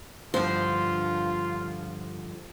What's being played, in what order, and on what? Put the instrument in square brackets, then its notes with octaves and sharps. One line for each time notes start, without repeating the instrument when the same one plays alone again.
[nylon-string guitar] G2 D3 F3 [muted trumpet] F4 [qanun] C5